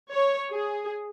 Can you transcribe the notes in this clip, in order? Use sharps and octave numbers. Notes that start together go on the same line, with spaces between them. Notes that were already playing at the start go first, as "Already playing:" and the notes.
C#5
G#4